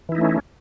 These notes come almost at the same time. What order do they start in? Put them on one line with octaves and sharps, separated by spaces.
E3 E4 D#4 A3 C#4